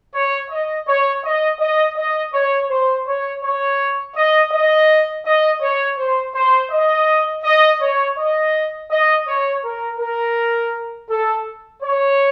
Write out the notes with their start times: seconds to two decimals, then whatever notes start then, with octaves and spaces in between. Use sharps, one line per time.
0.14 C#5
0.50 D#5
0.87 C#5
1.23 D#5
1.60 D#5
1.96 D#5
2.33 C#5
2.69 C5
3.06 C#5
3.43 C#5
4.15 D#5
4.52 D#5
5.25 D#5
5.61 C#5
5.98 C5
6.34 C5
6.71 D#5
7.44 D#5
7.81 C#5
8.17 D#5
8.90 D#5
9.27 C#5
9.63 A#4
9.99 A#4
11.09 A4
11.82 C#5